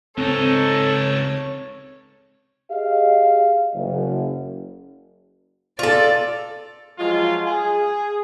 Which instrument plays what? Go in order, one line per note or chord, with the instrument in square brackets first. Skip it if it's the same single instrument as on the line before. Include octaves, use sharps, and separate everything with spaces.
[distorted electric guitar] C#2 D#4 [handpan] C4 [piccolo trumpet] A4 [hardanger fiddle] C#5
[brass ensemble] G4 G#4 D#5 F5
F#1
[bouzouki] F4 A4 [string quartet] D5
[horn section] F3 F#3 G#3 F4
G#4